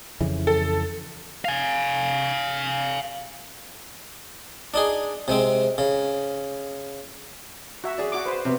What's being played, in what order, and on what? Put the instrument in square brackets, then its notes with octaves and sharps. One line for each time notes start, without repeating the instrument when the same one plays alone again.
[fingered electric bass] F2 C#3 E3
[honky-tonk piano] A4
[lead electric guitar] F5 G#5
[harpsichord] D4 D#4 G#4
C3 G#3 C4
C#3
[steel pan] F#4 E5
[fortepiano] G#4 D5
[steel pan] F#4 D6
B4 C5
[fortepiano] C3 B3